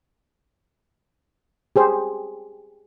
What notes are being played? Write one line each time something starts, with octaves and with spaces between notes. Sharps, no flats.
G4 G#4 C5